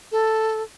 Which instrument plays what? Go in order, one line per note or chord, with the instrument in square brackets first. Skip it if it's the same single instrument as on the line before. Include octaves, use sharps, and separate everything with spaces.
[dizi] A4